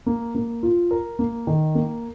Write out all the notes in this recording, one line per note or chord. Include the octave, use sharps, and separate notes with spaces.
A#3
A#3
F4
A#4
A#3
D#3
A#3